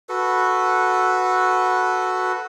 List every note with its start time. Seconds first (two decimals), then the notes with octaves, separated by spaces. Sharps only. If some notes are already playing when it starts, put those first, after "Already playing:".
0.09 F#4 A4 B4